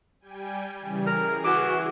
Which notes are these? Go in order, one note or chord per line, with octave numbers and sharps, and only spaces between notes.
G3 G5 G#5
C#3 E3 G3
G#4 A#4
E3 F#4 D6